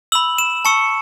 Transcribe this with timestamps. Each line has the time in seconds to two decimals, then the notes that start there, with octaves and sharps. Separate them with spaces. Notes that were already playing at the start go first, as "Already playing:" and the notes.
0.12 B5 E6 F#7
0.38 E7
0.65 A5 C#6 E6 C#7